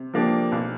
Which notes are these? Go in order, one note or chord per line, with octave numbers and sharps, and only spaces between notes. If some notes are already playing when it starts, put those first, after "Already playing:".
Already playing: C3
F3 A#3 D4 G4
B1